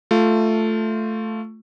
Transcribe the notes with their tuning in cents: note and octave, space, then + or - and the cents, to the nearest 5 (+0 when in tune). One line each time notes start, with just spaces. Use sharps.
A3 +0 F4 +0